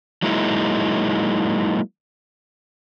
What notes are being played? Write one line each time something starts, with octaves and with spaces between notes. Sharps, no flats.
F#3 G#3 A#3 D#4 E4